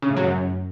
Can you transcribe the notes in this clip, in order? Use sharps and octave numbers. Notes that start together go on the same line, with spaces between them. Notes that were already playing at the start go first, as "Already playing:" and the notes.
C#3
A2
F#3
F#2